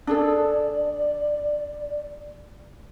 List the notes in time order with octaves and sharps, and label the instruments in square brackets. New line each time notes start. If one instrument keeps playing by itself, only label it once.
[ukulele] D4 G#4 A4 [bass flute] D5